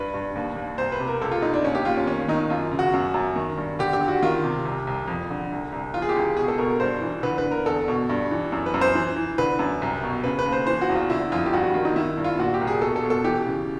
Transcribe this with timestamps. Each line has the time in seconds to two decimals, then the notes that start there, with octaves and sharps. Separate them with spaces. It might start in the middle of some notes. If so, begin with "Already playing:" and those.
Already playing: G2 B4
0.14 G2
0.35 D#2
0.56 D#2
0.78 C2 C5
0.92 B4
1.00 C3
1.08 A#4
1.22 C#2 A4
1.31 F4
1.42 C#2 D#4
1.54 D4
1.64 D#2 C#4
1.75 G4
1.85 D#2 F4
1.97 C#4
2.07 D#3 C#4
2.28 D#3 D#4
2.50 F#2 F4
2.71 C#3
2.79 F#4
2.94 F#2
3.14 F#2
3.36 D#3
3.57 G2
3.79 D3 G4
3.93 G4
4.01 D3
4.08 F#4
4.23 D#3 F4
4.44 C3
4.65 C2
4.87 C2
5.08 F2
5.30 D3
5.52 C2
5.72 C2
5.94 E3 F4
6.02 G#4
6.09 G4
6.16 C#2
6.37 B2 G#4
6.48 A4
6.58 B2 A#4
6.70 A#4
6.80 G2 C5
7.02 E3
7.23 D3 B4
7.38 B4
7.44 D3
7.51 A#4
7.66 E2 A4
7.88 B2
8.09 G2
8.31 E3
8.52 F#2
8.66 B4
8.74 F#2
8.81 C5
8.95 E3
9.16 E3
9.38 D3 B4
9.59 F#2
9.82 C2
10.03 B2
10.24 C#3 B4
10.39 B4
10.46 D#2
10.52 C5
10.67 E3 C5
10.81 F#4
10.89 E2
10.95 F4
11.10 D3 E4
11.32 F2 F4
11.46 G4
11.54 G2 F#4
11.64 F#4
11.74 D#3 F4
11.85 D#4
11.96 D#3 E4
12.17 G2
12.24 F4
12.38 A#2 F#4
12.54 G4
12.61 C2
12.67 G#4
12.82 B2 A4
12.96 A4
13.04 B2
13.10 A4
13.24 E3 G4
13.46 C#3